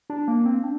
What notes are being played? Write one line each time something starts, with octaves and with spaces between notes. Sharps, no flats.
D4
A#3
C4
D4